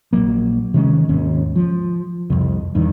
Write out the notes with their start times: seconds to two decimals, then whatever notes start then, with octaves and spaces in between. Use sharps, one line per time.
0.13 A#1 F#3 A#3
0.74 C3 D#3 G#3 C#4
1.09 G#1 D#2 C#4
1.56 F3
2.30 C2 F2
2.75 E2 G2 D#3